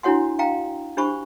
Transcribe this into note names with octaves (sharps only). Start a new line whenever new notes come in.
D4 E4 F#4 C#5 F#5 C6
F5 G5 A#5
D4 G4 C5 B5 C#6